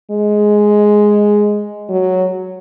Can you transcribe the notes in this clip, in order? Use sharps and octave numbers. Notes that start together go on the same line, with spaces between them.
G#3
F#3